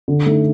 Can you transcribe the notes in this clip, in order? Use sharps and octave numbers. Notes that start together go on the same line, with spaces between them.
D3
A3 D#4